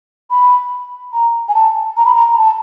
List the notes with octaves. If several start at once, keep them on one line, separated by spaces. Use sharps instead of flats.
B5
A#5
G#5
A5
A#5
B5
A#5
A#5
A5